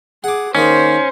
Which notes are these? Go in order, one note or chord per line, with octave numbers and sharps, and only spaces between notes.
G#4 F#5 D6
D#3 A#3 C#4 G#4 C5